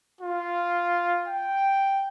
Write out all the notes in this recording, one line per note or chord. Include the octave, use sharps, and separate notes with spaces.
F4
G5